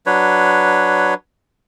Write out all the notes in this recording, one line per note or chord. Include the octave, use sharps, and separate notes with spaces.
F#3 D4 B4 C#5